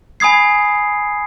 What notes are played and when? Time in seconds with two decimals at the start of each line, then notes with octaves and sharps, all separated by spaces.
0.20 G#5 B5 D#6 G#6 C7